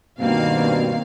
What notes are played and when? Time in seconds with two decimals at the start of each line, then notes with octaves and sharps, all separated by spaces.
0.19 G2 B2 D#3 A#3 C4 F5